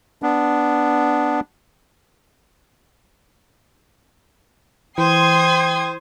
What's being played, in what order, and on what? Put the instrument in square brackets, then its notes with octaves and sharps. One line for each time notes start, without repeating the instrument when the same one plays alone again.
[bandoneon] B3 D4
[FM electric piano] E3 [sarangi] C5 [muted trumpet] G5 [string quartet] C6 D#6 G#6